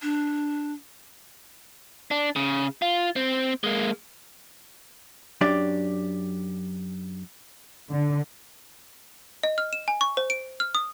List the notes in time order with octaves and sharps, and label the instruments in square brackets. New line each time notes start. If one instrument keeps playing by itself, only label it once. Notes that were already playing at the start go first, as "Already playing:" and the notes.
[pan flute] D4
[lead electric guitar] D4
C#3
F4
C4
G#3 A#3
[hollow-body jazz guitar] F#2 D4 G4 D5
[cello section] D3
[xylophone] D#5
F6
E7
G#5
C#6
C5
D7
F6
D#6